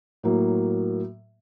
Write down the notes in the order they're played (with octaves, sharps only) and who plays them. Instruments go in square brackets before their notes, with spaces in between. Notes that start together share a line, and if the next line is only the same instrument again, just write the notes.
[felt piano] A2 F#3 A#3